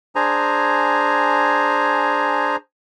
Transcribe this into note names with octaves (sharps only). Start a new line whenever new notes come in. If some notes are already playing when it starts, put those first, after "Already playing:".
D4 G#4 C5 G#5 A#5